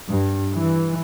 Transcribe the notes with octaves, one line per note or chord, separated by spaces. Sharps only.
G2
E3